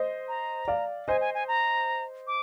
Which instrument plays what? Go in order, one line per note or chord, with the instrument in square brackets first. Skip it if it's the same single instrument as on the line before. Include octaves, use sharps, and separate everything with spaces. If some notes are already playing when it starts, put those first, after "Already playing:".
Already playing: [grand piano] C5 D#5
[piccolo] A#5
[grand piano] D5 F5
[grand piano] C5 D#5 [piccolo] G#5
[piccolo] G#5
G#5
A#5
D6